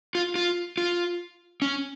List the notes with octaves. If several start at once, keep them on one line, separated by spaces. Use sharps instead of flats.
F4
F4
F4
C#4